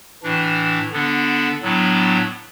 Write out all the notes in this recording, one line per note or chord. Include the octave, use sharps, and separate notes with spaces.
A2 E3 D4
D3 B3 D4
A2 F#3 B3 D4